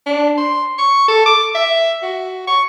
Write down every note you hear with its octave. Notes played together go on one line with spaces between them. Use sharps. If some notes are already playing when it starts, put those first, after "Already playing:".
D4
C6
C#6
A4
D6
E5
F#4
C#6